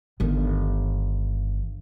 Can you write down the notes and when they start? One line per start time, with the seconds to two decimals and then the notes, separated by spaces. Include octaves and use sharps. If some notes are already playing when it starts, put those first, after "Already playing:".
0.20 G1 D#3